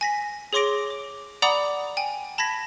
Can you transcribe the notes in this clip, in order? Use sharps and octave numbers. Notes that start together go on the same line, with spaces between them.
G#5 A#6 B6
G#4 C#5 C6 D6 A#6 D7
D6
D5 F#5 A#5 B5 D6 D#6
G5 G#5
A5 B5 G#6 A#6 B6